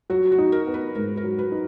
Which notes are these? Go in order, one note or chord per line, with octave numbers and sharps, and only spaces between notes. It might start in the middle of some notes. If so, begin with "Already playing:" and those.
F#3 F#4
F#4
D#4
A#4
B3
B4
G#2 A#4
A#4
F#3
B4
D#4